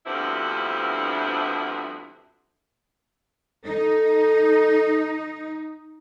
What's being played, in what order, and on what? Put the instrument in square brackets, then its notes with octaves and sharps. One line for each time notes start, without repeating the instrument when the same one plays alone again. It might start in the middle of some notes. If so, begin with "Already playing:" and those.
[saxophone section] D2 G2 F3 B3 C4 E4
[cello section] D#4 [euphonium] A4